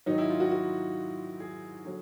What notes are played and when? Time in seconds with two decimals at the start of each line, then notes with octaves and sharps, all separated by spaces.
0.06 G#2 D#3 F#3 D#4
0.18 E4
0.29 F4
0.40 F#4
0.51 F#4
1.40 G#4
1.85 D3 F#3